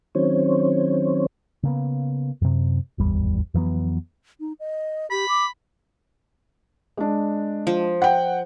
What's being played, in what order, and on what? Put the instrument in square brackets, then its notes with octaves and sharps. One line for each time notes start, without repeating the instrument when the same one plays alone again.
[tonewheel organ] D#3 F#3 C4 C#4 C5 C#5
[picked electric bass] C#3 A#3 B3
F#2 C3
D1 G#1 E2 G3
F2 E3 F#3 B3
[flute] D#4
D#5
[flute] G4 [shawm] B5
[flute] D6
[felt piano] G#3 D4
[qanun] F3
[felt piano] F#5 G5